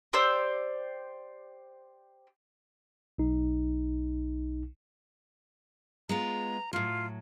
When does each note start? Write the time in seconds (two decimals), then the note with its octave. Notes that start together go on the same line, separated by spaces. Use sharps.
0.13 G4 C5 D5 E6
3.18 B1 D#4
6.09 G#3 B3 F4 A#5
6.73 A2 F#3 F4